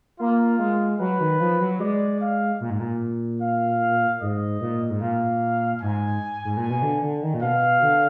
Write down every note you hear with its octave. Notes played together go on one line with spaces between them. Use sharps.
A#3 F4
G#3
F#3 B4
D#3
F3
F#3
G#3 D5
F5
A#2
G#2
A#2
F5
G#2 D#5
A#2
G#2
A#2 F5
G#2 G#5
G#2
A#2 G#5
B2
D3
D3
D#3
A#2
B2 F5
D3